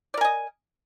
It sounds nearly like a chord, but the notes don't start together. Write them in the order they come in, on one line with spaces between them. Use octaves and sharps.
D5 A#4 G#5 D#5